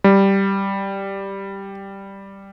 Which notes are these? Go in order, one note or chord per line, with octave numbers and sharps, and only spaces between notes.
G3